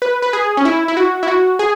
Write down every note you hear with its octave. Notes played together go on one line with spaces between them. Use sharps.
B4
B4
G#4
C#4
E4
E4
F#4
E4
F#4
G#4